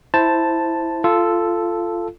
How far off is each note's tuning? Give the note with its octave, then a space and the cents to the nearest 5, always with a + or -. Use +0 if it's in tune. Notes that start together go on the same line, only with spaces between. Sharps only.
E4 +0 C5 +0 A5 +0
F4 -15 A4 +0